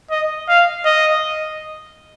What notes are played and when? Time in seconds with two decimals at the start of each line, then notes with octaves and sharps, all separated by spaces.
0.11 D#5
0.48 F5
0.85 D#5